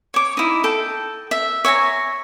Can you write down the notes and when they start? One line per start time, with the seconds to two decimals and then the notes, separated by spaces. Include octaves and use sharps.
0.14 C#5 D6
0.37 D#4 E4
0.64 A4 G5
1.31 E5
1.65 C#5 E5 G#5 A#5